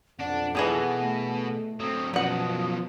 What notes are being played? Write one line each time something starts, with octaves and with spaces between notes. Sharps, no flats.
B1 F2 D4 F#5
B2 E3 G#4 A4
A3
F#3 C4 D#6
F#2 B2 F3 F#3 F4 F#5 D#6